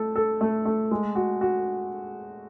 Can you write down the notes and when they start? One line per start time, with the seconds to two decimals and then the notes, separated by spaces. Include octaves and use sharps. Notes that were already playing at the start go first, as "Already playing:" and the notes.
Already playing: A3 A4
0.16 A4
0.41 A3
0.65 A3
0.91 G#3
1.15 F#4
1.41 F#4